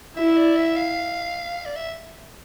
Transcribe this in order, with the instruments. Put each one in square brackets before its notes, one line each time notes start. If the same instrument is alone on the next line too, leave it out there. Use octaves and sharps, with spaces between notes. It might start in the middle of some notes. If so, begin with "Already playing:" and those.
[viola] E4 [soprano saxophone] E5
[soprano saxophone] D5
E5
F5
D5
E5